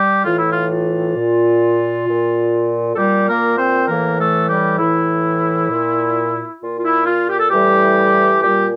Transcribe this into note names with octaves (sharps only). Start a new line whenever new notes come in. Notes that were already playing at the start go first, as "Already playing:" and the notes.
Already playing: G3 G4
A2 E3 F4
E4
F4
F4
A#2
A#2
A4
A#2 G3 G4
A#3 A#4
C4 C5
A2 E3 A#3 A#4
A3 A4
G3 G4
A2 E3 E4
A#2
A#2 F4
F4
E4
F4
G4
A4
A2 E3 G3 G4
A#2 G3 G4